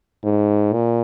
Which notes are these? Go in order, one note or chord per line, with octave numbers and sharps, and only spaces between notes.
G#2
A#2